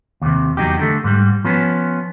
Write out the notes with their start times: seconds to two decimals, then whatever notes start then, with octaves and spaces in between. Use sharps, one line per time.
0.22 D#2 C3
0.57 E2 F#3 D#4 G4
0.79 D3 A3
1.04 G#2 G3
1.44 F3 B3 C#4